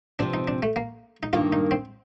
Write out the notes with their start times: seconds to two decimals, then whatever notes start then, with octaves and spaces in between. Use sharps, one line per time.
0.19 C3 F3 C4 D4
0.34 D#4
0.48 D4
0.63 A3
0.76 A#3
1.23 D#4
1.33 G2 D#3 A#3 F4
1.53 D#4
1.71 C4